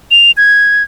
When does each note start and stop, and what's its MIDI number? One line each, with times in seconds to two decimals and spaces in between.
0.11 0.31 101
0.37 0.83 92